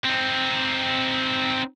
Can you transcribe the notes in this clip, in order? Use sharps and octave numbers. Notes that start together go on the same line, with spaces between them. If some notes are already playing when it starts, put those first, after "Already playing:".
C4 D#4